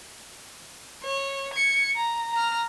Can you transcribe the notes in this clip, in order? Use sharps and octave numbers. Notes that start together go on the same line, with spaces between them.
C#5
G#6 C#7
A#5
A#5 F6